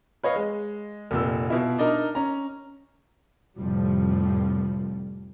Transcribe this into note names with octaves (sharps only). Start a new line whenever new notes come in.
B4 C#5 D#5 F5
G#3
F1 A#2 E6
B2 E4 F4
D4 D#4 A#4 A#5
C#4 A#5
F1 A2 F3 G3